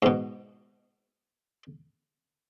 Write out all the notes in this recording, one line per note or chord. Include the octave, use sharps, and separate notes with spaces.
G#2 B2